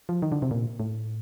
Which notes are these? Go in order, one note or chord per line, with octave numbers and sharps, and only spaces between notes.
F3
D#3
D3
C3
A#2
A2